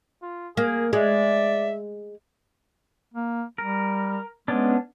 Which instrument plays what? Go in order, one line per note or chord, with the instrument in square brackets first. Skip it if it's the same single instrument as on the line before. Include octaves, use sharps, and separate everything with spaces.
[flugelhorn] F4
[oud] A#3 [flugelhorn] G#4
[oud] G#3 [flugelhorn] D5 [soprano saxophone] E5
[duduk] A#3
[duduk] G3 [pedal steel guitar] A#4
[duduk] G#3 [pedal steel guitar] B3 C#4 D4